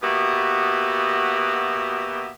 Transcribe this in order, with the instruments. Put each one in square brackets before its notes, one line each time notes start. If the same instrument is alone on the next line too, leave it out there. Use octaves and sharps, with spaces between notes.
[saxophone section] B2 A#3 B3 F#4 G4 E5